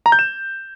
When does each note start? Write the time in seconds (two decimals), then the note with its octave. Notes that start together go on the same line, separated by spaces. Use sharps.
0.06 A#5
0.12 G6
0.19 E7